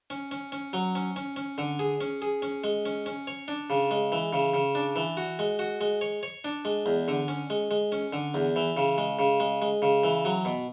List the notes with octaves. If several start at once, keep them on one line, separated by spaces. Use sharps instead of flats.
C#4
C#4
C#4
F#3
C#4
C#4
C#4
D3
G#4
C#4
G#4
C#4
G#3
C#4
C#4
C#5
D4
C#3
G#3
E3
C#3
C#3
D4
E3
F#4
G#3
F#4
G#3
C#5
C#5
D4
G#3
E2
D3
C#4
G#3
G#3
C#4
D3
E2
E3
C#3
G#3
C#3
G#3
G#3
C#3
E3
F#3
B2